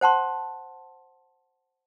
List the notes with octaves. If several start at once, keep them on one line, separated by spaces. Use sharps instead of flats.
C5 F#5 A5 C6